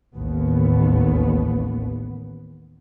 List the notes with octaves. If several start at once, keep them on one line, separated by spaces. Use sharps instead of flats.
A1 D#2 B3